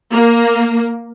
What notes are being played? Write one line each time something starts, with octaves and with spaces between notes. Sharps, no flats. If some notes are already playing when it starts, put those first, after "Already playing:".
A#3